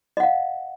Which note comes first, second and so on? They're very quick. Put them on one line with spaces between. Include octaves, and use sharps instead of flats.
D#5 F#5 F5